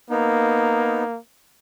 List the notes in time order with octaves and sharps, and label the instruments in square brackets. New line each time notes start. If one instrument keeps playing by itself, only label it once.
[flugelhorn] A#3 [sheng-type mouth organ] B3 D#4